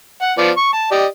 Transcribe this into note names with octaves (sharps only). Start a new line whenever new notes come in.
F#5
F3 B3 D5
C#6
A5
G4 D5 D#5